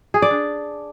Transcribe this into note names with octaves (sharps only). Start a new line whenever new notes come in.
G#4
D5
D4